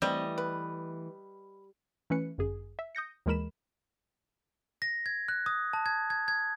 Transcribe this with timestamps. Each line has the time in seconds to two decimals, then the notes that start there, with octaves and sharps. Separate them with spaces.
0.02 E3 G3 A3 C4 D#5
0.38 B4
2.10 E3 A3 C#4 B4 C#7
2.38 G1 F#2 G#4
2.79 E5
2.95 D#6 G6 A#6 C#7
3.26 D#2 E3 G#3 A#4 B5 E7
4.82 A#6
5.06 G#6
5.28 F#6
5.46 D#6
5.73 A5
5.86 G#6
6.10 G#6
6.28 G#6